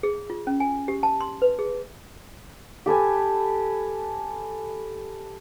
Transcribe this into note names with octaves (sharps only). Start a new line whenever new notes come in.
G#4
F4
C#4
G#5
G4
A5
C6
B4
G#4
G4 A4 B4 G#5